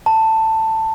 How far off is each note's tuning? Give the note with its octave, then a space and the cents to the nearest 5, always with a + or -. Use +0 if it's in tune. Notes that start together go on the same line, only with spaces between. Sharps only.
A5 +15